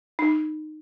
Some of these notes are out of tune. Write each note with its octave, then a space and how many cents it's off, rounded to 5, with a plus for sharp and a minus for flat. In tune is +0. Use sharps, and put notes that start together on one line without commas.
D#4 -15